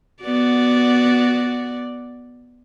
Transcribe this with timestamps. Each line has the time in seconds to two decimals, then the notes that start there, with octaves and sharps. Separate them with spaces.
0.21 B3 F#4 D5